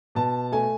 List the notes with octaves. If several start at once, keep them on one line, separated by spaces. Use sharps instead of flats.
B2 A5
A3 G#5